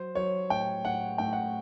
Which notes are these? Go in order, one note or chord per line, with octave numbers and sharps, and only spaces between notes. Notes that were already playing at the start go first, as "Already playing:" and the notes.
Already playing: F#3 C5
F#3 C#5
A2 G5
A2 F#5
A2 G5
F#5